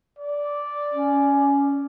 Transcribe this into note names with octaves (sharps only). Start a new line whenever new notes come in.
D5
C#4